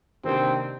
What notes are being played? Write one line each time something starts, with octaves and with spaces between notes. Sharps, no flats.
C3 D#3 A#3 C4 D4 G4